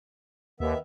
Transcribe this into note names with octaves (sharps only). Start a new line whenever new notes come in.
D#2 D#3 B3 E5